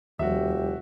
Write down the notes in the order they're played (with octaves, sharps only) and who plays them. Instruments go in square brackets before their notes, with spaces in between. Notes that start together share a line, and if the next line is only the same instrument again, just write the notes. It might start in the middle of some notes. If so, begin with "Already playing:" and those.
[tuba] F1 [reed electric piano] D#2 F3 G3 [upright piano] F#4 E5 [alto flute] G4